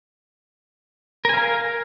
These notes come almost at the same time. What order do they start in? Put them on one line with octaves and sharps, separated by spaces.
A#4 G#5 F5